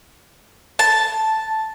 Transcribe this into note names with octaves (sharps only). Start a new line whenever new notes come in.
A5